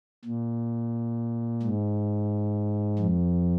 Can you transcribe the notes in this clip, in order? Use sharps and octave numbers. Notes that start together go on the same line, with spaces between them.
A#2
G#2
F2